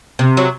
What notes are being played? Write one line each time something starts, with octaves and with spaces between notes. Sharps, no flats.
C3
F#3